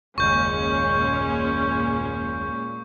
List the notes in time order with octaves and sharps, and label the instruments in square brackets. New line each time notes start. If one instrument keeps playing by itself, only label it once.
[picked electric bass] F#1 D#2 [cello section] A#2 [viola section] G#3 C#4 [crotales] C#6 G6